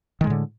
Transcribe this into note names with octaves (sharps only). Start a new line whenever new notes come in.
A2 D3 D#3 G#3